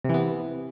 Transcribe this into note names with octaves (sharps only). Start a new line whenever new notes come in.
C3 E3 B3